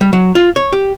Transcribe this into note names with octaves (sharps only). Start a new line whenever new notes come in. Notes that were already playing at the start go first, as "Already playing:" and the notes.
G3
F#3
F4
C#5
G4